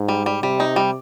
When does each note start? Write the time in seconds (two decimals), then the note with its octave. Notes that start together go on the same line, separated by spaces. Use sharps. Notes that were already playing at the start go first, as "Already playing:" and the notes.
Already playing: G#2
0.09 G3
0.26 G3
0.43 C3 G3
0.60 D#4
0.76 G3